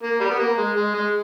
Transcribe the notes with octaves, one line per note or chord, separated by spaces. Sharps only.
A#3
G3
B3
A#3
G#3
G#3
G#3